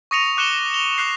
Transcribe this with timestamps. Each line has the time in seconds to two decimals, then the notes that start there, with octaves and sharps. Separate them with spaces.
0.11 C#6 D#6 A#6 C#7 D#7 F7
0.37 D6 F#6 C#7 E7 G7
0.74 F7 G7
0.98 D6 F#6 C7